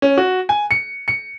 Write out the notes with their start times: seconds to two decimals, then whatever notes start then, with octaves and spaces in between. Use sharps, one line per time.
0.02 C#4
0.18 F#4
0.49 G#5
0.71 C#7
1.08 C#7